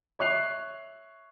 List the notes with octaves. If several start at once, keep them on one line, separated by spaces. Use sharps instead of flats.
C#5 E5 C#6 F#6 C7 F7